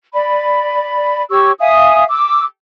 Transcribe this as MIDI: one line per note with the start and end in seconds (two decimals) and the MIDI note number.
0.14 1.24 74
0.14 1.24 83
1.30 1.51 67
1.30 1.51 73
1.30 1.51 85
1.30 1.51 88
1.59 2.04 76
1.59 2.04 77
1.59 2.04 80
1.59 2.04 87
2.09 2.44 86
2.09 2.44 88